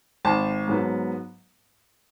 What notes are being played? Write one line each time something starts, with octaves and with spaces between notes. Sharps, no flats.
G#1 A5
G#2 F#3 B3